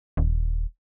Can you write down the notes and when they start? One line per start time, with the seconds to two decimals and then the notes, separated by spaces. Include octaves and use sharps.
0.17 D#1